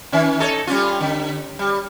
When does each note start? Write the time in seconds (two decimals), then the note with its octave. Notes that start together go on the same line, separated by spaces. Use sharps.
0.12 D#3 C#4
0.39 D#4 A4 C#5
0.67 G3 C#4 F4
1.00 D3
1.59 G3